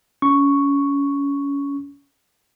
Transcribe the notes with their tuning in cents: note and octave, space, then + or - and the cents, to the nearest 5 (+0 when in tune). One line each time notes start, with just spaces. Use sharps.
C#4 +25 C#6 +0